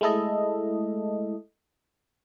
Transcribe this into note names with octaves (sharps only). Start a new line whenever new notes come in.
G#3 A3 E4 A4 D#5